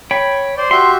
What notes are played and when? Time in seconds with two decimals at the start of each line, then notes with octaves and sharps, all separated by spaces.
0.11 C#5 G5 B5
0.57 C5 D5 C6
0.71 F#4 G4 E5 C6